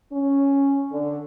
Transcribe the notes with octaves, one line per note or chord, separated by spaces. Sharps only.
C#4
D3